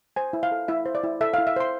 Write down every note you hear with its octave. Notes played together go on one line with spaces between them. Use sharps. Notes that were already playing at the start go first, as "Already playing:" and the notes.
C5 G#5
E4
F5
A4
E4 E5
C5
D5
E4
A4 E5
F5
E4
E5
C5 C6